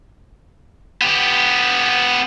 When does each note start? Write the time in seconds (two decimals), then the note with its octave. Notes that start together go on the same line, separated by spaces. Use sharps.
1.01 B3 G4